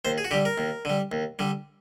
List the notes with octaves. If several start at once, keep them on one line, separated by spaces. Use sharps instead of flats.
D#2 C5
G#4
F#4
D3 G3 G4
A#4
D#2
D3 G3
D#2
D3 G3